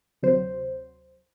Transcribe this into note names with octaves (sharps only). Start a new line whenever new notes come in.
D2 C3 F#3 C5